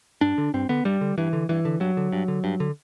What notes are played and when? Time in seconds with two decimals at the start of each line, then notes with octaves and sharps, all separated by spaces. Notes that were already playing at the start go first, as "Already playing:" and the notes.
0.21 G2 D4
0.38 D3
0.54 G2 C4
0.69 D3 B3
0.85 G2 G3
1.01 D3
1.18 G2 E3
1.33 D3
1.49 G2 E3
1.65 D3
1.80 G2 F#3
1.97 D3
2.12 G2
2.28 D3
2.44 G2
2.60 D3